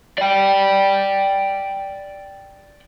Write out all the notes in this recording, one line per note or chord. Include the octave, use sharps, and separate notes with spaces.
D5 G5